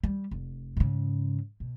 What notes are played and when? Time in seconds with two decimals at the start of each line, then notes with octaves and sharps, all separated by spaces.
0.04 G3
0.31 F1
0.77 G#2 C#3
1.60 B2